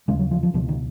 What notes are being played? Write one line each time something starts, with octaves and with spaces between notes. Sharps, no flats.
D#2 C#3 G#3
F#3
F3
F3
C#2 B2 F3
D#3